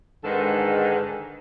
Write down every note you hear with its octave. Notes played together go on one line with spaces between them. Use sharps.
G#2 D3 D#3 G#3 A4 B4